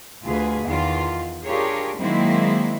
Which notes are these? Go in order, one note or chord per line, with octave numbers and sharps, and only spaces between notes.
D2 F4 G#4 B4
E2 D#3 F4
D4 F4 G4 G#4 A#4 C#5
D#3 F#3 G#3 A#3 C4 E4